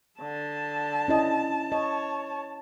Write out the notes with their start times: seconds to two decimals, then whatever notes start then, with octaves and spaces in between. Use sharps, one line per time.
0.21 D3 A5
1.08 C#4 E4 D#5
1.72 C#5 D#5